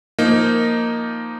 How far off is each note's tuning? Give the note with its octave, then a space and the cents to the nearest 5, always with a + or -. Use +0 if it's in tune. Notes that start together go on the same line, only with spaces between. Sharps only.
F3 +0 A#3 +0 D#4 +0